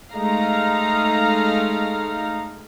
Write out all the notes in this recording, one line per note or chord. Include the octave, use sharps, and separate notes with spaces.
G#3 A3 D#4 F5 A#5